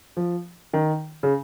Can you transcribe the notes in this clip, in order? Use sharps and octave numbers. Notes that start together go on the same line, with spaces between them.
F3
D#3
C#3